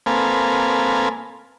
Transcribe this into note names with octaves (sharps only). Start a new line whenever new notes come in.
A#3 C4 A4 B4 F5 G#5